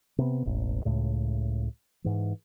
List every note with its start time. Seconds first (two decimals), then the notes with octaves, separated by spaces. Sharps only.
0.18 C3 B3
0.45 E1 A1
0.85 C#2 A2 C#3
2.04 G#2 E3